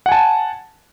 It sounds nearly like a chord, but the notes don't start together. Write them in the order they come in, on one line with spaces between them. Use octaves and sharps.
F#5 G#5 A5